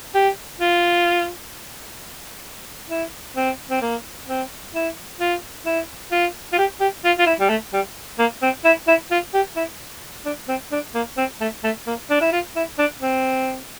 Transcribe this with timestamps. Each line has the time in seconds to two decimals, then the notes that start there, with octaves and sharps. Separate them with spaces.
0.14 G4
0.60 F4
2.89 E4
3.36 C4
3.70 C4
3.81 A#3
4.28 C4
4.74 E4
5.20 F4
5.66 E4
6.11 F4
6.52 F4
6.58 G4
6.80 G4
7.04 F4
7.18 F4
7.26 E4
7.40 G3
7.49 A3
7.73 G3
8.19 A#3
8.42 C4
8.65 E4
8.87 E4
9.11 F4
9.34 G4
9.56 E4
10.25 D4
10.48 C4
10.72 D4
10.94 A#3
11.17 C4
11.40 A3
11.63 A3
11.87 A#3
12.10 D4
12.21 E4
12.32 F4
12.56 E4
12.78 D4
13.01 C4